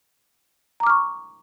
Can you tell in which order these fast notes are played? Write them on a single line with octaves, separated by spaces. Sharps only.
A#5 D6 F6 C#6